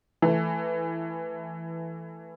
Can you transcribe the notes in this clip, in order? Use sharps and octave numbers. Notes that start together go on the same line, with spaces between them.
E3 A3